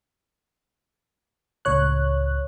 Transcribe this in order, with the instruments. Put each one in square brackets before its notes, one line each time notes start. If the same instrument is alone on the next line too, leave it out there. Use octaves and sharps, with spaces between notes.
[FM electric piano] C#2 A2 C#5 F#6